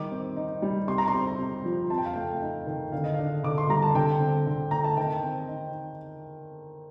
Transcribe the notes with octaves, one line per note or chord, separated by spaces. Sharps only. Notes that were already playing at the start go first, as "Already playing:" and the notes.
Already playing: D#3 G3 D6
C4
D#4
G3
C3 C6
A#5
C6
C4
C3
F3
F2 A5
G5
F5
A3 G5
D#4
D#3
D3 F5
D#5
D4 F5
D3 D6
C6
G3 A#5
A5
D3 G5
C4
D3
A3 A#5
A5
D#3 G5
C4
D#4